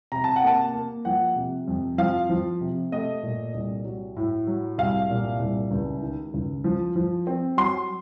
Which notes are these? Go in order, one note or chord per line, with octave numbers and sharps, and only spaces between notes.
C3 A#5
A5
F#5
A#3 A5
A#3
F3 F#5
C3
F2
F3 F5
F3
C3
A3 D#5
A#2
C2
F#3
A2
F#3
C2 F5
A#2
C2
C#2
D#3
C#2
F3
F3
C4
F#3 C6